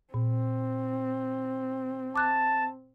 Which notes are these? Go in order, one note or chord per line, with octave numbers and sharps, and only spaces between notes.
A#2 C4
A5 D6 F#6